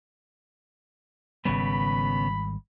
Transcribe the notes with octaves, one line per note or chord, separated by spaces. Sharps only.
G#1 C#3 G3 B3 B5